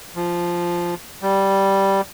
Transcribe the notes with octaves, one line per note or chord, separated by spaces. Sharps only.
F3
G3